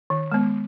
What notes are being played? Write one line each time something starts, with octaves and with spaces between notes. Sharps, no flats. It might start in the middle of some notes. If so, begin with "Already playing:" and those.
D#3
G#3 B3